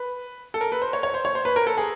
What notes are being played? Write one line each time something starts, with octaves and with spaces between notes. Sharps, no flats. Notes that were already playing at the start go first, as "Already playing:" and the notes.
Already playing: B4
A4
A#4
B4
C5
C#5
C#5
C5
C#5
C5
B4
A#4
A4
G#4